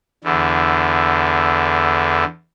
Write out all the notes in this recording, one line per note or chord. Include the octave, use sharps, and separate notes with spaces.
E2 D3